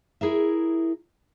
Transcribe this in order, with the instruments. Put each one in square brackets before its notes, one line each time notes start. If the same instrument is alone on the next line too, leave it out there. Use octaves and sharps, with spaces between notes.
[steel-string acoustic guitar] E4 G#4 A#4 E5